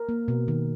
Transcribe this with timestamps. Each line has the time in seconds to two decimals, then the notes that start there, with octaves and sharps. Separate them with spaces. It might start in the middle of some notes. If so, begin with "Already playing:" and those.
Already playing: A#4
0.09 A#3
0.28 B2
0.48 D#3